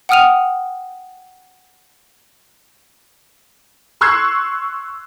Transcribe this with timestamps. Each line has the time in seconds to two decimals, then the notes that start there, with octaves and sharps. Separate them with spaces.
0.09 F#5 G5 D#6 F6 D#7 F7
4.01 C6 C#6 E6 F#6 G#6 C7